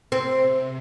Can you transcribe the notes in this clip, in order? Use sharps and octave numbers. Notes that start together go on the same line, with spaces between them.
C3 C4